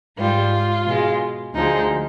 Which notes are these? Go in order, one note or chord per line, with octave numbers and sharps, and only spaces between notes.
G#2 G3 F4
B2 G#3
D2 D3 F3 G#3 D#4